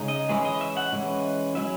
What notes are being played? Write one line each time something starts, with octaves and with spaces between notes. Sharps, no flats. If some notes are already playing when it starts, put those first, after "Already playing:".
Already playing: C#3 G#3 D#4
D#5
E3 G#3 C#4 E4 G#4
D#5
E5
F#5
E3 G#3 C#4 E4
F#3 C#4 E4 E5